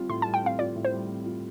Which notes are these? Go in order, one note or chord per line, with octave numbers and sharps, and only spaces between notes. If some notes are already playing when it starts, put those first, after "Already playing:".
Already playing: G3 C4 F4
A2 C6
A5
G3
G5
C4 F5
F4 D5
A2
C5
G3
C4
F4